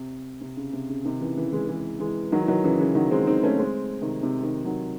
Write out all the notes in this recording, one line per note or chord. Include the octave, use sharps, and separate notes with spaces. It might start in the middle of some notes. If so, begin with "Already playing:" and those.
Already playing: C3
C3
C#3
C3
C#3
C3 D#3
C#3 E3
C#3 E3
E3 G#3
E3 G#3
E3 G#3
D#3 F#3
E3
D#3 F#3
C#3 E3
C#3 E3
D#3 F#3
G#3 C4
C4 D#4
A3 C#4
G#3 C4
C3 D#3
C3 D#3
C3 D#3
D#3 F#3